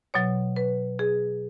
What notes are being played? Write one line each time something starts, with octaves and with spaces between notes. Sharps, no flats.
B2 F#3 C#5
B4
G#4